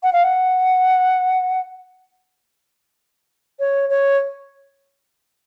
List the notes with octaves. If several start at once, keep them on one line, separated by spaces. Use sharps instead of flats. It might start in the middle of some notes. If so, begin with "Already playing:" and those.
F#5
F5
F#5
C#5
C#5